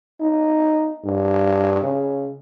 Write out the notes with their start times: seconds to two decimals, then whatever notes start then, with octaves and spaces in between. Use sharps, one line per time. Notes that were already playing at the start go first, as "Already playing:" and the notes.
0.20 D#4
1.04 G2
1.82 C#3